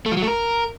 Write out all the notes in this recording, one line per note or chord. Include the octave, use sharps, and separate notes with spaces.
A3
F3
F#3
A3
A#4